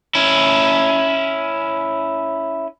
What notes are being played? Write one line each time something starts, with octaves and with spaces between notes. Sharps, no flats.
C#4 E4